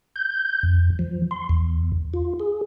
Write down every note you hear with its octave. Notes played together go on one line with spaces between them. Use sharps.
G6
F2
F3
C6
E2
F4
G#4